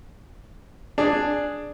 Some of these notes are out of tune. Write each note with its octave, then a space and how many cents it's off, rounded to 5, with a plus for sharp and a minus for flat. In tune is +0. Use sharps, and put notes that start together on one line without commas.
D4 +0 G#4 +0